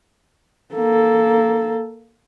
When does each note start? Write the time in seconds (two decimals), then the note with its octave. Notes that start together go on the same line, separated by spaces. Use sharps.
0.75 A#3 A4